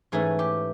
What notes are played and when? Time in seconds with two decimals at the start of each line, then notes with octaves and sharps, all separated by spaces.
0.12 G#2 E3 A3 C#4 G#4
0.39 G4